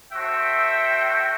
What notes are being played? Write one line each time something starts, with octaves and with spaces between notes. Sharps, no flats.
F#4 A4 C5 E5 G5